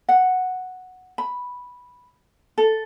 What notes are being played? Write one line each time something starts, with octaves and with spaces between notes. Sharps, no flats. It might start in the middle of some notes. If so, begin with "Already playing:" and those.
F#5
B5
A4